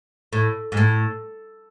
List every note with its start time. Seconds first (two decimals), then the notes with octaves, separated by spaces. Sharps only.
0.33 A2
0.72 G#2
0.77 A2